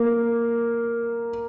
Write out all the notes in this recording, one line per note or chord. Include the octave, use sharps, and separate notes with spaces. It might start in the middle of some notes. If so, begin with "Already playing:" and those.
Already playing: A#3